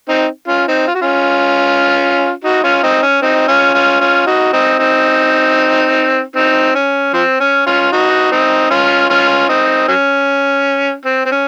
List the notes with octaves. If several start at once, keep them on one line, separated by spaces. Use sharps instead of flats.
C4 D#4
C#4 F4
C4 D#4
F4
F#4
C#4 F4
D#4 F#4
C#4 F4
C4 D#4
C#4
C4 D#4
C#4 F4
C#4 F4
C#4 F4
D#4 F#4
C4 D#4
C4 D#4
C4 D#4
C#4
F3 C4
C#4
C#4 F4
D#4 F#4
C4 D#4
C#4 F4
C#4 F4
C4 D#4
F#3 C#4
C4
C4
C#4